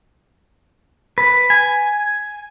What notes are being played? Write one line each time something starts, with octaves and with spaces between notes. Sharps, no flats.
B4
G#5